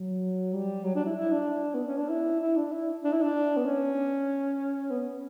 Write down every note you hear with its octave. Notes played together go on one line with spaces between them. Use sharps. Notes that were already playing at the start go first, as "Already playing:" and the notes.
Already playing: F#3
G3
F#3
D4
E4
E4
D4
B3
C#4
D4
E4
E4
D4
E4
D4
E4
D4
B3
C#4
B3